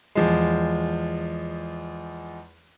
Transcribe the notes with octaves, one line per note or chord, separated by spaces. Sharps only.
E2 F3 G#3